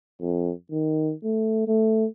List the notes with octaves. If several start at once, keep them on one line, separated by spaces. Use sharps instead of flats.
F2
D#3
A3
A3